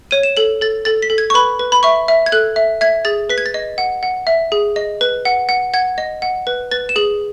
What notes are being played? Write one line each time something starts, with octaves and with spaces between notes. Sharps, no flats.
C#5 D#7
E7
A4 F#7
A4 A6
A4 A6
B6
A4
G#6
C#6
B4 B5
B4
B5
E5 C#6
E5
G#6
A4 F#6
E5
E5 G#6
G#4 A6
B4 B6
G#6
A6
D#5
F#5
F#5
E5
G#4
D#5
B4
F#5
F#5
F#5 G#6
D#5
F#5
B4
B4 A6
E7
G#4 F#7